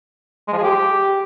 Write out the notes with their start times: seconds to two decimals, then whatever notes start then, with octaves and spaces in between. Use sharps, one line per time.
0.48 G#3
0.53 F3
0.58 G#4
0.63 G4